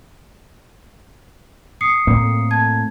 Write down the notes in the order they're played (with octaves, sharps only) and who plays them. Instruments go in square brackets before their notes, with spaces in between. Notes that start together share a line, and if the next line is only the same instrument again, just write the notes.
[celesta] D#6 C7 C#7
[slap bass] A2 A#3 C4
[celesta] A5 G#6